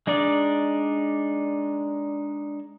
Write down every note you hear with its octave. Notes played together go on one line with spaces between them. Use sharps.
G#3 D4 D#4 D5